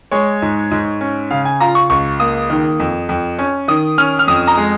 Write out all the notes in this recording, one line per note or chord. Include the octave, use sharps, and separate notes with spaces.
G#3 C#5
G#2
G#2
C#4
C#3 F5
G#5
F4 A#5
C#6
C#2 C#6
A#3 D#6
D#3
F2
F2
C#4
D#3 D#6
C#4 F6
F6
F2 D#6
A#5
G#3